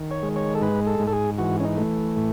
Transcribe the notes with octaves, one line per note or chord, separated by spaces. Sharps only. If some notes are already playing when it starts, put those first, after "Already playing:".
Already playing: D#3
C#5
G#3
C#5
A4
G#2 B4
A4
G#2
A4
G#4
E3 F#4
C#4
D#4
A3
A2